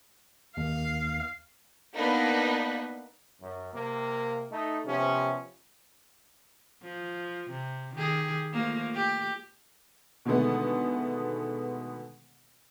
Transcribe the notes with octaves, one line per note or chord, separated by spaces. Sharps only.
D#2 F5
A#3 B3 D4 D#4 B4
F#2
C3 A#3
A3 D#4
C3 F3 B3 C#4
F3
C3
D#3 G4 G#4
F3 A3 A#3
G4
B2 D3 D#3 G#3 A3 B3